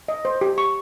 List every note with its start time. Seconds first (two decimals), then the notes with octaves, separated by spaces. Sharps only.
0.08 D#5
0.25 C5
0.41 G4
0.58 C#6